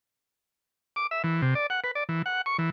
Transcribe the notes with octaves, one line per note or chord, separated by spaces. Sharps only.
D6
E5
E3
C3
D5
F#5
B4
D5
E3
F#5
C#6
E3